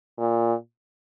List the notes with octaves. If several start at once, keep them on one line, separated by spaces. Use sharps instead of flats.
A#2